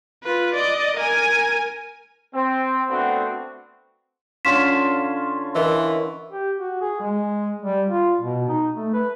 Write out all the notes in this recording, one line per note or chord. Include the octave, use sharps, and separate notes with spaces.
F4 B4
D5 D#5
A#4 G#5
C4
A3 B3 C4 D4 F#4
D3 C#4 F4 B6 E7
E3 A#4 D#5 E5
G4
F#4
G#4
G#3
G3
F4
B2
D#4
A3
B4